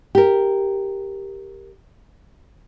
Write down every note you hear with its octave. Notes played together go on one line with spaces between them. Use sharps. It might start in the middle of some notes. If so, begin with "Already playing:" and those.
G4 A#4